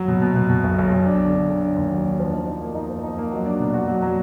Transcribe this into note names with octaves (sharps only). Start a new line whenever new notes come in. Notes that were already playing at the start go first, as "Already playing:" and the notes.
Already playing: F#3
B2
B2
B2
B2
B1
B1
B1
D4
D3
D3
D3
D4
D#2
F#3
D4
F3
D#4
D#4
A#3
D#4
F3
D#4
A#3
F#3
D4
B2
F#4
F#3
F#3